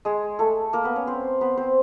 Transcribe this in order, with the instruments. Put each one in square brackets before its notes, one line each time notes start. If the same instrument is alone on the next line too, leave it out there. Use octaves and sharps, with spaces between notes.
[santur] G#3 G#4
A3 A4
A#3 A#4
B3 B4
C#4 C#5
C4 C5
B3 B4
C4 C5